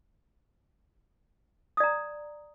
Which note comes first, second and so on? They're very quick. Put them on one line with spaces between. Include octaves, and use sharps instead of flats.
D#6 D5 A#5